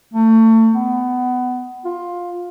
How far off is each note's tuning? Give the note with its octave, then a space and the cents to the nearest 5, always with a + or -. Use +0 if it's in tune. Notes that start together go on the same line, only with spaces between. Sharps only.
A3 +30
B3 +20
F4 +15